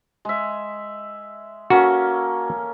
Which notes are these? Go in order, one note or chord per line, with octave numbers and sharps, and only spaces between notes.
G#3 E5
A#3 C#4 F#4 A4